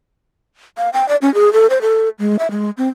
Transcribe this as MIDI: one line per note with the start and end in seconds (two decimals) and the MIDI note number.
0.78 0.89 77
0.93 1.07 79
1.09 1.16 74
1.22 1.33 61
1.34 1.52 68
1.53 1.67 69
1.70 1.81 72
1.81 2.09 69
2.19 2.36 56
2.39 2.50 76
2.51 2.70 56
2.77 2.88 60